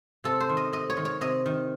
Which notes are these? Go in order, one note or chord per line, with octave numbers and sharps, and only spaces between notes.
C3 A4
C5
D#3
D#5
C3 D#5
C#5
D#3
C#5
C3 D#5
D#3